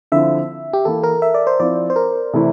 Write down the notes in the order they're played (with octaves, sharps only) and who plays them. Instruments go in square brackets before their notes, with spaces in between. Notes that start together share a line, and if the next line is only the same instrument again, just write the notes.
[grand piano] D3 F3 C4 E4 [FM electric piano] E5
[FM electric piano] G4
[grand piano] E3 A#3 E4 [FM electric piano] A4
[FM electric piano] A#4
E5
D5
C5
[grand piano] F3 C4 E4 [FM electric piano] D5
[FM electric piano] C5
A#4
[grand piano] C3 E3 A3 E4